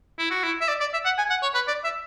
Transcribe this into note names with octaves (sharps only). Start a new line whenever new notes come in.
E4
F#4
E4
E5
D5
D5
E5
F#5
G#5
F#5
C#5
B4
D5
E5